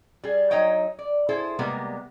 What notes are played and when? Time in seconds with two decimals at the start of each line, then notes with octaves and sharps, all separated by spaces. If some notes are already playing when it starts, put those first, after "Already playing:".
0.24 G3 G#4
0.51 F#3 D#4 C#5 D#5 G5
0.99 D5
1.29 E4 G#4 A4 C5
1.59 C3 G3 G#3 A#3 B3